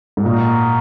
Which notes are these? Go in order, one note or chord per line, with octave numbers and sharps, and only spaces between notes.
G#2
A#2 D#4 F#4 A#4 D#5